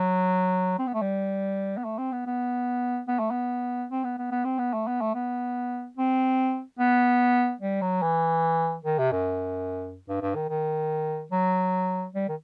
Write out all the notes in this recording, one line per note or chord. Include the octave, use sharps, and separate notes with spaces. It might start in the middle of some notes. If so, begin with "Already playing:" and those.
Already playing: F#3
C4
B3
A3
G3
B3
A3
C4
B3
B3
B3
A3
B3
C4
B3
B3
B3
C4
B3
A3
B3
A3
B3
C4
B3
G3
F#3
E3
D#3
C3
F#2
G2
G2
D#3
D#3
F#3
G3
D#3